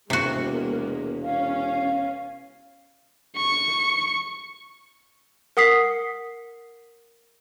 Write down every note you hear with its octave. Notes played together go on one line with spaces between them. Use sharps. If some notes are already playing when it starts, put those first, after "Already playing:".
E1 C3 G#3 A#3 B3 F#4
C#4 F5
C#6
A#4 F#5 D#6 B6 C7